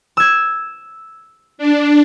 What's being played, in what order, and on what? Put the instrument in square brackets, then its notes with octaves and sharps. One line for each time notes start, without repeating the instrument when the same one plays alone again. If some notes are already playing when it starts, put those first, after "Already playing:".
[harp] E6 G#6
[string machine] D4